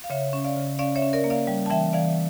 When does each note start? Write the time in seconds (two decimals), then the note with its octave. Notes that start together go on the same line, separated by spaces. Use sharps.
0.04 F5
0.10 C#3 C#5 E5
0.33 C#4
0.44 D5 F5
0.57 C#3
0.79 C#4 D5 F5
0.96 C#5 E5
1.02 C#4
1.13 A#4 D5
1.24 A#3
1.30 D5 F5
1.47 G3
1.66 A5
1.70 E3 E5 G5
1.93 E3 D5 F5